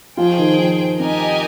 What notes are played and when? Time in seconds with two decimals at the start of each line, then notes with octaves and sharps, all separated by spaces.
0.17 F3 F4 G#4 C5 G5
0.38 D#3 D#4
0.58 F3 F4
0.99 C4 D#4 G4 A#4 D#5 G#5